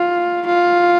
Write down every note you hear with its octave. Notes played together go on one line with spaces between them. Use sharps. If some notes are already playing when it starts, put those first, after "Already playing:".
Already playing: F4
F4